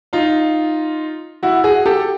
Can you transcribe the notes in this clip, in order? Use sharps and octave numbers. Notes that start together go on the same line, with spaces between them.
D#4 F4
E4 F#4
F#4 G#4
G4 A4